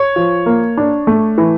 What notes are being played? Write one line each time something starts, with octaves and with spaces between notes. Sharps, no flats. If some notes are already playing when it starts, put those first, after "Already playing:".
Already playing: C#5
F3
A#3
D4
A3
E3